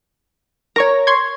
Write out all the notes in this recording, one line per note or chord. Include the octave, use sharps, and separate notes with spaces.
A#4 C#5 A#5 C#6
C6 C#6 G#6